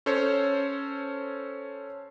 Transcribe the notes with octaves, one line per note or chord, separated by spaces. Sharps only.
C#4 A4 C5 C#5